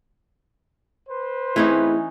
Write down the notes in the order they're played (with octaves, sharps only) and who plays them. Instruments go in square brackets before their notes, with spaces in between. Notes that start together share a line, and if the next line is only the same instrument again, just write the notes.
[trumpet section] B4 C5
[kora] E3 C#4 D#4 [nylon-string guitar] A3 C4 G#4 [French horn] E4